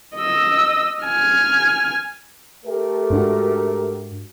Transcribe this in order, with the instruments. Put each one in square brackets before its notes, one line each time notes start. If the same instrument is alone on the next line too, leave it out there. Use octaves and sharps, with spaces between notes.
[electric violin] D#5 E6
G#5 F6
[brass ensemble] A3 G4 A#4
[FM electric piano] G#2 D4 F#4